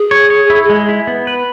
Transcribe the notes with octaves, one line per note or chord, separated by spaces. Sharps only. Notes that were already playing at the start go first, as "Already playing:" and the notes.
Already playing: G#4
C#5
C#5
E4
G#3
E4
B3
B4